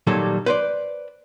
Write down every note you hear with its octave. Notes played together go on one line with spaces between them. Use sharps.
A#2 D#3 F#3 G3 A4
B4 C5 D5